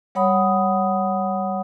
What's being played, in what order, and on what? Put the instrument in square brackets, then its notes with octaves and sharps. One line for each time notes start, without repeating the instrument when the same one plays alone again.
[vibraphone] G3 C#5 F#5 B5 D#6